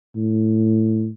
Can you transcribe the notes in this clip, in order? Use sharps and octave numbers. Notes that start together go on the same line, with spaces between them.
A2